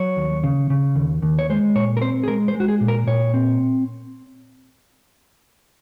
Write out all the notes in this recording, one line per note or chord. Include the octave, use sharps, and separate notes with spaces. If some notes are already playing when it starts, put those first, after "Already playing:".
Already playing: F#3 C#5
D#2
C#3
C#3
D#2
D#2
C#5
G#3 C5
A#2 C#5
A#4
C4 C5
G#4
G#3 A#4
C5
G#3
F#4
G#4
A#2
A#4
A#2 C#5
C4